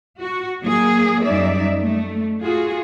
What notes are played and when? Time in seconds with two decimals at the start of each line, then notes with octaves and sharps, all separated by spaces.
0.22 F#4
0.61 F#3 A#3 G#4
1.24 F#2 G3 D#4 D5 E5
1.81 A3
2.43 F4 F#4 G#4